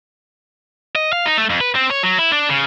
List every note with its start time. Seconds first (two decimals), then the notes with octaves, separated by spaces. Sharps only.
0.96 D#5
1.13 F5
1.25 D#4
1.38 A3
1.49 F2
1.61 B4
1.75 C4
1.90 C#5
2.03 F#3
2.19 E4
2.32 D4
2.49 C#3